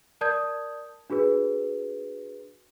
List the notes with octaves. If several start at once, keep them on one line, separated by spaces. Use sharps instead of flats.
A#4 D5 A5 D#6 G6 G#6
D4 F#4 G#4 B4